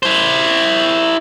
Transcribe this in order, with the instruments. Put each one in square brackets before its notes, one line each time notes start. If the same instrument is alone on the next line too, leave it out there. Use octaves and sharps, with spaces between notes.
[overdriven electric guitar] E4 C5